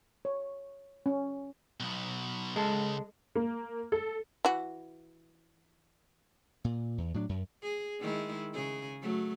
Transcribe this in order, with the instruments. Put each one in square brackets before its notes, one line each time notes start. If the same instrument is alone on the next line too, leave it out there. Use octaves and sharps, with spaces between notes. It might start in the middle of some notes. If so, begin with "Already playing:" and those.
[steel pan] C#5
C#4
[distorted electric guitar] B1 B2
[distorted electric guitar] C#2 [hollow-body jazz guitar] G#3 A4
[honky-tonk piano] A#3
A4
[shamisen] E3 F#4
[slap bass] A#2
E2
A2 F#3 A#3 D4
F#2
[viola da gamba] G#4
D#3 G#3 E4
C#3 G#4
F#3 A3